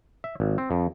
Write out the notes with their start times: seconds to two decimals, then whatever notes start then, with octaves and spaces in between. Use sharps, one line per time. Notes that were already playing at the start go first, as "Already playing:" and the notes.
0.24 E5
0.40 G#1
0.58 C4
0.71 F2